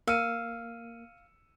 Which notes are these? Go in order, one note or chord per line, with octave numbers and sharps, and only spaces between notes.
A#3 F5 E6 C#7 D#7